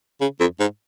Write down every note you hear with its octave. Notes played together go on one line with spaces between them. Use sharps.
C#3
F2
G#2